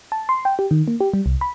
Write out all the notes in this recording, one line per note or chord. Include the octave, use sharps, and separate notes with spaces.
A5
C6
G5
G4
D#3
A#3
G4
G3
C2
B5